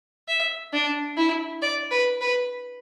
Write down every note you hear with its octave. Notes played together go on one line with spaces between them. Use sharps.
E5
D4
E4
D5
B4
B4